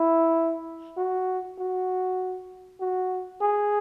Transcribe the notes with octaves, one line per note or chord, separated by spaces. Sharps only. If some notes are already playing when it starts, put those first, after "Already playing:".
Already playing: E4
F#4
F#4
F#4
G#4